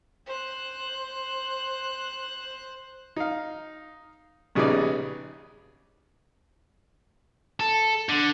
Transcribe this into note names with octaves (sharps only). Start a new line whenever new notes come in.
C5 F#6
D#4 F5
A#1 C#3 G3 B3 D#4 D5
A4
D3